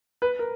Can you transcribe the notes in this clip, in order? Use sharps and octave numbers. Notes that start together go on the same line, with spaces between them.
B4
A#4